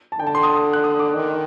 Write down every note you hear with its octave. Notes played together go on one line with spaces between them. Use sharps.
A5
D3 G5
A5
C6
D#6
F#6
D#6
D6
D#3